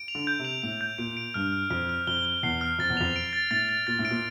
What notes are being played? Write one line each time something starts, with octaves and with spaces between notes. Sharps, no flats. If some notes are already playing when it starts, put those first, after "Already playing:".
Already playing: D7
F7
D3
G6
C3
F7
A2 F7
G6
A#2 D7
D7
G2 F6
F6
F2 F6
F6
F2 G7
G7
E2 C7
F6
F2 A6
E2
F2 F7
D7
A6
A2 A6
A6
A#2 A6
A2
D7
A#2